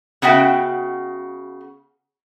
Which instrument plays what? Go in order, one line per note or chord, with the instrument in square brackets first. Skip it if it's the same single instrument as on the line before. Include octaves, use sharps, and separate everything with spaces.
[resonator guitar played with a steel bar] C#3 B3 F#4 E5 G5